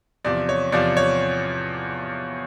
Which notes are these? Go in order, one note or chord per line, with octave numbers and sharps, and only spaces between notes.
E2 C3 F3 D5
C#5
E2 C3 F3 D5
C#5